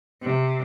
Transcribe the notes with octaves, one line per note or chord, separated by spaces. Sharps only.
C3